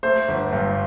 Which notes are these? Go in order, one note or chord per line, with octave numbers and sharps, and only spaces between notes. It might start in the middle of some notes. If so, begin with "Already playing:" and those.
A3 C5
G1
G2